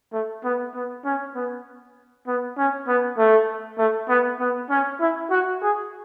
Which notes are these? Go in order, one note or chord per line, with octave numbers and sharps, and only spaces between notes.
A3
B3
B3
C#4
B3
B3
C#4
B3
A3
A3
B3
B3
C#4
E4
F#4
G#4